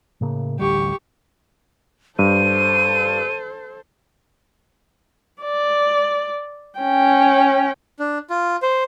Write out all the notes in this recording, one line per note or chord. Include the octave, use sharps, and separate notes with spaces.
A2 C#3 A#3
A1 D2 G3 G4 C#6
G2 A4 C5 D#7
D5
C#4 G5
D4
F4
C5